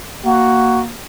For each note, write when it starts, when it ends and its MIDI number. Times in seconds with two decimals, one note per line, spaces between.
0.25 0.90 58
0.25 0.81 66